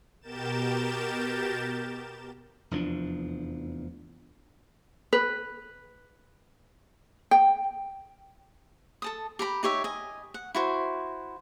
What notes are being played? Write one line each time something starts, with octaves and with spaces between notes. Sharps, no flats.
B2 G4 A#4 G6 A6 E7
F1 E2 F3 D4
B4
G5
A4 A5 D#6
G4 A#5 B5
D#4 G4 C#5 E5
D#5 G#5
F#5
E4 F#4 C5